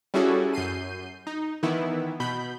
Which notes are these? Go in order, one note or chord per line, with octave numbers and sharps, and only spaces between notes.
G3 C#4 E4 F#4 G#4 A4
F#2 G6 C7 D#7
D#4
D#3 E3 B3 E4
B2 B5 G6